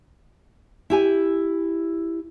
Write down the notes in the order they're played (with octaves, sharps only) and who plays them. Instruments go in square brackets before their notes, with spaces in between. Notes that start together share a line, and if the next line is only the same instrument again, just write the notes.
[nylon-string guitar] E4 G4 G#5